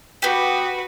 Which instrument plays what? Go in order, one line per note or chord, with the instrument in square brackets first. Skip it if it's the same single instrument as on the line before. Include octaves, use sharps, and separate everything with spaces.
[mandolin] B3 G4 [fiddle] F#4 B4